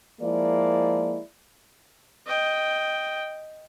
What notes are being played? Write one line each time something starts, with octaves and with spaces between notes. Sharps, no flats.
F3 G#3 A#3 E4 D5
D#5 G5